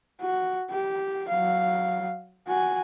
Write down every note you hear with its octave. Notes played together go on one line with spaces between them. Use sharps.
F#4
G4
F#3 F5
F#4 G#5